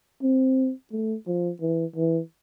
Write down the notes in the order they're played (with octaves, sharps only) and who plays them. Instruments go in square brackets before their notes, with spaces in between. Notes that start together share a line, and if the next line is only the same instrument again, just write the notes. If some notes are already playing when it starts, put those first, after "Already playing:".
[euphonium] C4
A3
F3
E3
E3